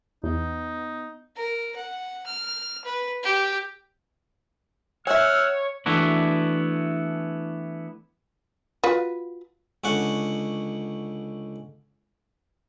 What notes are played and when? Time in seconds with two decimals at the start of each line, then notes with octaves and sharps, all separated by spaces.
0.24 E2 B3 D#4
1.36 A#4
1.76 F#5
2.27 F6
2.84 B4
3.23 G4
5.07 C#5 E5 F#5 G#5 E6 F6
5.86 E3 A3 B3 D4 E4 F#4
8.84 F4 F#4 B4
9.84 C#2 D3 C#4 F#5